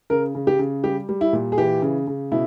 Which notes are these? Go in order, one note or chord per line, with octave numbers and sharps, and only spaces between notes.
C#3 A#4
C#3
G4
C#3
G3 G4
G3
E4
A#2
G#4
E3 G4
C#3
C#3
B2 E4